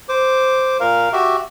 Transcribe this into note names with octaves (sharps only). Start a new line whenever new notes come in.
C5 D6
A#2 A#4 F5
F#4 G4 E5